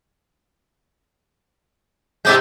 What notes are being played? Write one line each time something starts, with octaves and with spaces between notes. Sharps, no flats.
G#2 C3 G#3 E4 D6 G6